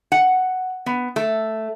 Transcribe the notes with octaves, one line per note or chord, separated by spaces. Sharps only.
F#5
B3
A3